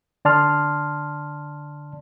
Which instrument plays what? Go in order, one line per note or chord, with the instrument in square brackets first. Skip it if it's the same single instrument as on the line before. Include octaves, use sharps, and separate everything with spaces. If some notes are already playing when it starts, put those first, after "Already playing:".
[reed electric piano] D3 D5 A5 C6 F6